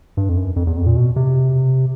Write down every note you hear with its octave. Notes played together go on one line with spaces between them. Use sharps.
G2
F2
F#2
F2
E2
F2
A#2
B2
C3